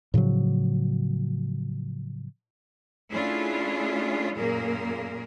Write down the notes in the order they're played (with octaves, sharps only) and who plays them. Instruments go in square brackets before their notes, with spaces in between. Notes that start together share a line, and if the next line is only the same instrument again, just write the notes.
[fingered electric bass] A2 C#3 F3 F#3
[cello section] A3 C#4 D4 E4 F4 G#4
F#2 A#2 A#3 G#4 A#4